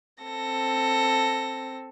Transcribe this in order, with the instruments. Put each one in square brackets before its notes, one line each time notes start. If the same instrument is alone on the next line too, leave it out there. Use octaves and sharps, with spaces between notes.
[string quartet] C4 A4 A#6